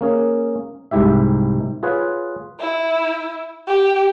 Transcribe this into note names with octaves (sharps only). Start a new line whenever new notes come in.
A#3 C#4 G#4
C2 G#2 G#3 E4 G4 E5
F4 G#4 B4 C#5 F#5
E4
G4